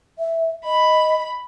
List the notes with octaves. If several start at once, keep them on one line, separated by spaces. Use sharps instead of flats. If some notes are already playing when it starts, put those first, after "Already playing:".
E5
D#5 B5